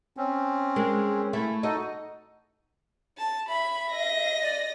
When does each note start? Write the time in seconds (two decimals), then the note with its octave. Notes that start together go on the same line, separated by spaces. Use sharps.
0.17 C4 C#4
0.76 G#3 A#4
1.33 A3 E4
1.63 D#4 F#4 A4 D#5
3.18 A5
3.49 E5 B5
3.90 D#5 A#6
4.42 D5